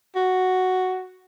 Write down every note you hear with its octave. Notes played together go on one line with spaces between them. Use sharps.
F#4